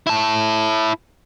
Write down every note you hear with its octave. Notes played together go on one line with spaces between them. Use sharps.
E4 A5